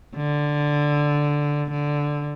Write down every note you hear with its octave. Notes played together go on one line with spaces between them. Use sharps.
D3
D3